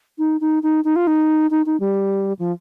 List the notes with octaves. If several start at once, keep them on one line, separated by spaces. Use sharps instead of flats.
D#4
D#4
D#4
D#4
F4
D#4
D#4
D#4
G3
F3